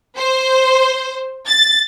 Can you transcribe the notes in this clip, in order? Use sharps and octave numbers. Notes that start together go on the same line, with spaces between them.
C5
A6